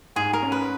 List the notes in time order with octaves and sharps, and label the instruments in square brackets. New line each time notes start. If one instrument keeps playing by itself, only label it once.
[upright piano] G#2 [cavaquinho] G#4
[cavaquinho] A#4
[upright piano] C#4
[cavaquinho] B4